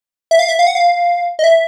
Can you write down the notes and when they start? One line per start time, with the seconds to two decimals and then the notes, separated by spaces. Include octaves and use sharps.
0.31 E5
0.39 F5
0.48 E5
0.59 F5
0.67 F#5
0.75 F5
1.39 D#5
1.44 E5